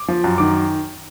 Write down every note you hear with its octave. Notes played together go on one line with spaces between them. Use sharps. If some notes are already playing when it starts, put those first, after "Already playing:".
Already playing: D6
F3
F#2
D#3 D6